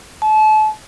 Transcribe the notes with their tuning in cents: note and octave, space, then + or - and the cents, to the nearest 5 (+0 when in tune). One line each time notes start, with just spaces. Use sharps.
A5 -35